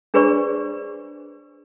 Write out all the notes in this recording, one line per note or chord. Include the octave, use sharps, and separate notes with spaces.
D4 G#4 B4 C5 D5 C#6